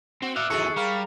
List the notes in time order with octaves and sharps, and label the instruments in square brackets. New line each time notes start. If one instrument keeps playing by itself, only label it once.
[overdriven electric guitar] C4 [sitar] F#4
[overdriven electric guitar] D5 F5 [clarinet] E5 [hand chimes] F#6
[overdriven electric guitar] E2 F#3 [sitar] D#3 G#4 A4 [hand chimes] C#6 C#7
[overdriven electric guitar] G3 [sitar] A#4 [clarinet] F5